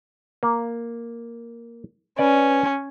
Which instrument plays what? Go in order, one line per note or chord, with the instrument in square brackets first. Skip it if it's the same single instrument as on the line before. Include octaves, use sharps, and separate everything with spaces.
[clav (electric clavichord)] A#3
[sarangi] C#4 [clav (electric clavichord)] B4 D5